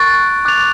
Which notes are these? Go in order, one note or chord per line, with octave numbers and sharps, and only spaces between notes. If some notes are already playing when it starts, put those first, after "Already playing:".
Already playing: C#6 F#6 A6 D7
D6 F#6 A6 F7